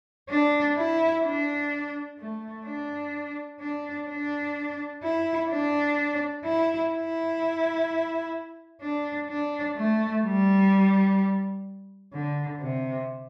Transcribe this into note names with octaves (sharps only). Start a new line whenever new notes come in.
D4
E4
D4
A3
D4
D4
D4
E4
D4
E4
E4
D4
D4
A3
G3
D3
C3